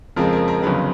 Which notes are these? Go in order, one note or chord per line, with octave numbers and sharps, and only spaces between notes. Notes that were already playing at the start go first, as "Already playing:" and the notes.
F2 C#3 F3 G#3 C4 A#4
A#4
A#4
G1 F2 C#3 F#3 B4